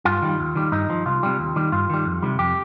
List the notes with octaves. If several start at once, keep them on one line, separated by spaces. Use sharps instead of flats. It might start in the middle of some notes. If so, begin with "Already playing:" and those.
G2 F4
D#3 G3
D#2
D#3 G3
G2 D#4
F3
C2 F4
C3 G3
D#2
D#3 G3
G2 F4
D#3 G3
F2
C3 D#3 G3
F2 G4